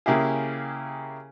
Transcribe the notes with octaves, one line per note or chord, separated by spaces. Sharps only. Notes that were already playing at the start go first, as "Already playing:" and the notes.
C#3 A#3 E4 G4 G#4